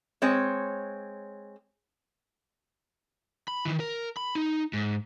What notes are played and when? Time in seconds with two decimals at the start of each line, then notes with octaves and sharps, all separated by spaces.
0.22 G#3 C4 C#5
3.48 B5
3.65 D#3 E3
3.80 A#4
4.17 B5
4.35 D#4
4.73 G#2